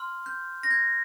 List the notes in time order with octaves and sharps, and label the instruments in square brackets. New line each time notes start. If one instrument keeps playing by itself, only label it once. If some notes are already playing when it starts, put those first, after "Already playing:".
Already playing: [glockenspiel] C6 F6
G6
A#6
G#6